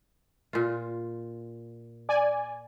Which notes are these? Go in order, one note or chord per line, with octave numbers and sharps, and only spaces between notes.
A#2 F4
D5 G#5